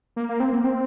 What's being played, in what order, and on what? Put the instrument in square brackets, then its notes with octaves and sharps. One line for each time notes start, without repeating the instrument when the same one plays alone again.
[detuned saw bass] A#3
A#3
C4
A#3
C4